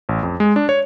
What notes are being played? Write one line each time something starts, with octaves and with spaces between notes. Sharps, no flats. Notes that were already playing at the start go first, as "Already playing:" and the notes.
A1
F2
G#3
D4
C#5